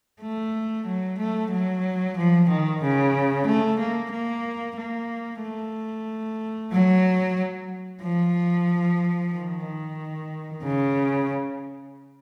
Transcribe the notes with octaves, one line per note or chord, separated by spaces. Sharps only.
A3
F#3
A3
F#3
F3
D#3
C#3
A3
A#3
A#3
A#3
A3
F#3
F3
D#3
C#3